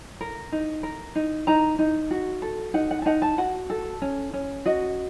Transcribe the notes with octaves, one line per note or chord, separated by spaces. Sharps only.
A#4
D#4
A#4
D#4
D#4 A#5
D#4
F#4
A4
D#4 F#5
F#5
A5
D#4 F#5
A5
F#4 F#5
A4
C#4
C#4
F#4 D#5